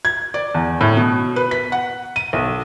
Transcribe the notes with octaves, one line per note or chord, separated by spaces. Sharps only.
G#6
D5
E2
A2
B2
B4
B6
F#5
D#7
B1